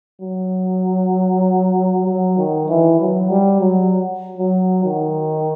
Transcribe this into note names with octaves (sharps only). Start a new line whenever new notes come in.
F#3
F#3
D#3
E3
F#3
G3
F#3
F#3
D#3